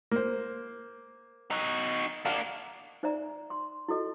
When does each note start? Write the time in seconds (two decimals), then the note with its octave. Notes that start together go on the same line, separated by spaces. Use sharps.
0.11 A#3 C5
1.51 D#4 F#4
2.26 A#3 D4 F5 F#5
3.03 D#4 C5 D5 E5 A#5
3.50 C6
3.88 E4 F#4 A4 D#5